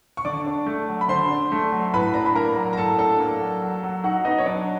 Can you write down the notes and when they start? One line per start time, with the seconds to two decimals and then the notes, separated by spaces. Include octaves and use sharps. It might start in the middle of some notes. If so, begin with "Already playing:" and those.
0.17 C#6
0.25 D3 D5 D6
0.46 D4
0.66 A3
0.88 F#3
1.01 B5
1.08 D3 C5 C6
1.31 D4
1.52 A3
1.72 F#3
1.94 A2 B4 B5
2.14 D4 A#5
2.26 B5
2.35 A#3 A#4 A#5
2.56 F#3
2.73 A#5
2.77 A2 A4 A5
2.98 D4 A4 A5
3.20 A#3
3.40 F#3
3.62 F#3
3.83 F#3
4.04 D#4 F#4 F#5
4.25 B3 D#4 D#5
4.38 C#5
4.46 F#3 D4 D5